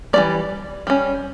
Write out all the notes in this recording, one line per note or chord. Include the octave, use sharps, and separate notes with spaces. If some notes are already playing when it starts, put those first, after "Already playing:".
E3 G3 A#3 D5
G3 C#4